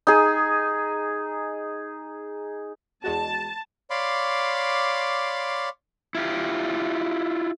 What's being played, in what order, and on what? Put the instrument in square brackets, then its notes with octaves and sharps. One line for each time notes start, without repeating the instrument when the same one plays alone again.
[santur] D#4 G#4
[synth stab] E2 G#3 F#4 [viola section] A5
[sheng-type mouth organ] C#5 D5 F5 B5 C6 D6
[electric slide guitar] E4 F4 G4